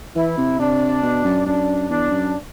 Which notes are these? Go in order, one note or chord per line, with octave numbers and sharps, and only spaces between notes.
E3 E4
C3
C3 D4
B2
F#2
F#2 D4
E2 D4
F#2